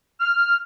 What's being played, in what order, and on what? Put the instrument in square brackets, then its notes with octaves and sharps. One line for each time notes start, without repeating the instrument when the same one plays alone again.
[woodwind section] F6